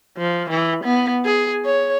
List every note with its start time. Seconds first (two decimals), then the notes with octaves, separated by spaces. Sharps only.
0.17 F3
0.50 E3
0.84 B3
1.25 G#4
1.65 C#5